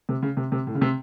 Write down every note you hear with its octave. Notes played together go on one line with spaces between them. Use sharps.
C3
C#3
C3
C3
A2
C#3
C3